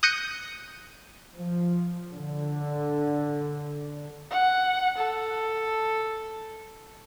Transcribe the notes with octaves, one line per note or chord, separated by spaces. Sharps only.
D#6 F#6 G6 A#6 C#7 D#7
F3
D3
F#5
A4